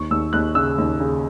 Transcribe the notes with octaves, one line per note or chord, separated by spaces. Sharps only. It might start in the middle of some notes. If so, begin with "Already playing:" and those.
Already playing: D#2 C#6
D#2 E6
D#2 F#6
C#3 E6
D#2
C#3